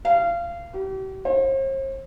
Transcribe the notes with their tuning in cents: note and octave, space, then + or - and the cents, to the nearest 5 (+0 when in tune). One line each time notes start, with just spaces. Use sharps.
F5 -25
G4 -40
C5 +45